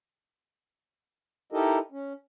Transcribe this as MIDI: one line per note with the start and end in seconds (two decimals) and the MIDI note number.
1.52 1.79 63
1.52 1.79 64
1.52 1.79 67
1.52 1.79 69
1.52 1.79 70
1.52 1.79 75
1.92 2.13 61